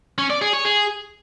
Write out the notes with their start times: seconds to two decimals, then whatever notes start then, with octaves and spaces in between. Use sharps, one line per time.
0.18 C#4
0.30 D5
0.42 G#4
0.53 C#5
0.65 G#4